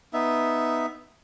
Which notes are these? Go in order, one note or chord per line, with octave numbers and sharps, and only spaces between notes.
B3 D#4 E5